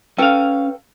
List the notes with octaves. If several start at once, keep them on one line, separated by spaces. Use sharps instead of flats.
C#4 A4 B4 F5 G5